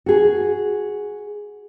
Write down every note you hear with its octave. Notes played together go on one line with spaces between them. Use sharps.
F#4 G#4